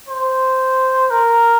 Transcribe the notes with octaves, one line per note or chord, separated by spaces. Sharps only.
C5
A#4